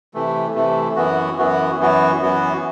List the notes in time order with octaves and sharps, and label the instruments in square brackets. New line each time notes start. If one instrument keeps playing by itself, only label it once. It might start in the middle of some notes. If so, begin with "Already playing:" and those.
[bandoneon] C3 E3 A3
C3 E3 A3
F#2 E3 B3 F#4
F#2 E3 B3 F#4
F#2 E3 B3 F#4
F#2 E3 B3 F#4